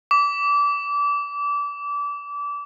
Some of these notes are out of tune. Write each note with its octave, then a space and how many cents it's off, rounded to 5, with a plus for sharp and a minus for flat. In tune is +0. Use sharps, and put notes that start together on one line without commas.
D6 -25